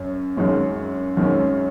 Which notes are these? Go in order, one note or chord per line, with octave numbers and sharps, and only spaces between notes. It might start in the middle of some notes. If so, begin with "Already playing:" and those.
Already playing: F#2 C#4
F#2 D#3 G#3 C#4
F#2 D#3 G#3 C#4